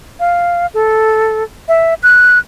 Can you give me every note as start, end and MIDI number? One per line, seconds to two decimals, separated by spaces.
0.20 0.66 77
0.74 1.44 69
1.68 1.94 76
2.03 2.39 90